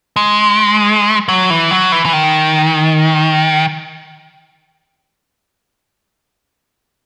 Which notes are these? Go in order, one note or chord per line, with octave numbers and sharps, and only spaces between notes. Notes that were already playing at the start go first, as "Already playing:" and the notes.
G#3
F#3
E3
F#3
E3
E3
D#3